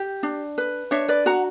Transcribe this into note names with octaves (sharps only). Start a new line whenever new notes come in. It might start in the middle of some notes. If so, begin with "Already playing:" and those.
Already playing: G4
D4
B4
D4 C#5 E5
B4 D5
F#4 F#5 A#5